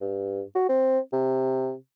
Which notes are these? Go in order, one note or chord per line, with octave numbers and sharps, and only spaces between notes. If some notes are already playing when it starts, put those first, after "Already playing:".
G2
F#4
C4
C3